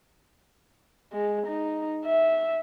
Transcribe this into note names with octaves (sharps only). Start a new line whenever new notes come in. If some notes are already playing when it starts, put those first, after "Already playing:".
G#3
D#4
E5